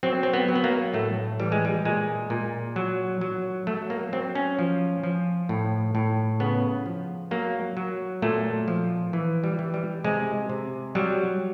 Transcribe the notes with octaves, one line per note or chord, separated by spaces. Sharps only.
F#3 C4
C4
B3
F#3
B3
A#3
A2 A3
E3 G3
G#3
G3
A#2 G#3
A#2
F#3
F#3
F#3 A3
A#3
F#3 C4
C#4
F3
F3
A2
A2
C#3 B3
F3
F#3 A#3
F#3
A#2 A3
F3
E3
G3
E3
G3
C3 G#3
C3
F#3 G3